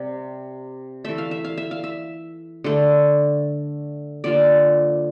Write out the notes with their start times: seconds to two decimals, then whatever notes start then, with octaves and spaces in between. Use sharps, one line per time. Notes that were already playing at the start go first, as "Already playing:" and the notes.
Already playing: C3 G3 D5
1.04 E3 A3 E5
1.18 F5
1.31 E5
1.44 F5
1.57 E5
1.71 F5
1.84 E5
2.64 D3 A3
4.24 D3 F3 A#3 D5